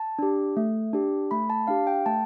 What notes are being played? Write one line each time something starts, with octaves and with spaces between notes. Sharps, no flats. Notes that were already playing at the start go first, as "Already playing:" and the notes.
Already playing: A5
D4 G4
A3
D4 G4
A3 B5
A5
D4 G4 F5
G5
A3 A5